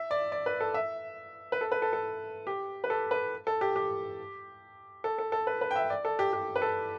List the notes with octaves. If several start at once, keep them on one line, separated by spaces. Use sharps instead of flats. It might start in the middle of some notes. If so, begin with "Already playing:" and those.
Already playing: E5
D5
D5
B4
A4
E5
B4
A4
B4
A4
A4
G4
B4
A4
B4
A4
G4
G4
A4
A4
A4
B4
B4
G5
E5
D5
A4
G4
G4
B4
A4